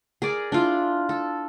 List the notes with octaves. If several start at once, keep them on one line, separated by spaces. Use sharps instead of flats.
G#4 A#4 D5
D4 E4 F4
A4